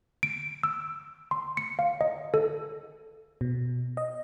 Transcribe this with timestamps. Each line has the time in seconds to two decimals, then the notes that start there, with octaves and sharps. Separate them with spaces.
0.23 D7
0.63 E6
1.31 C6
1.57 C#7
1.79 F5
2.01 D#5
2.34 A4
3.41 B2
3.97 D#5